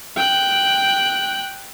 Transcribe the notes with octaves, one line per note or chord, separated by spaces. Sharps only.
G5 F#6